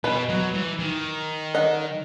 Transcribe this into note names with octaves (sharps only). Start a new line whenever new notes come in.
B2 B4 D#5
F#3
E3
D#3
D#5 F#5